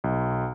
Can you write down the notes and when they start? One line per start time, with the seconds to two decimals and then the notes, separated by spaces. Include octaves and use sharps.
0.04 B1